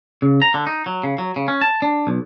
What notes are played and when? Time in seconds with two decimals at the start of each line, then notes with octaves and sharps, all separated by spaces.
0.22 C#3
0.42 A#5
0.54 D3
0.67 D#4
0.86 F#3
1.04 C#3
1.18 F#3
1.36 C#3
1.48 C#4
1.61 A5
1.82 D4
2.07 B1